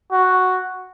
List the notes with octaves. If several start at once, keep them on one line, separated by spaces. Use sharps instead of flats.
F#4